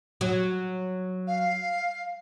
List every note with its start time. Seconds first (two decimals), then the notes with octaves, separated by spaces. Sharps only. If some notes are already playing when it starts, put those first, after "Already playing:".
0.21 F#3
1.27 F5